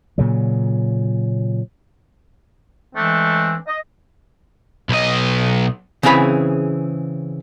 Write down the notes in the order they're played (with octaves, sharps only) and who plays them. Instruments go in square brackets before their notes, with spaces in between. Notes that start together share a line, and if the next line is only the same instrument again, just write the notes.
[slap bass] A#2 C#3 F#3
[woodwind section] E3 G#3 A3 C4 D4
D#5
[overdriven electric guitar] B1 D#5
[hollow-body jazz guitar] C#3 E3 C4 G#4 F#5 B5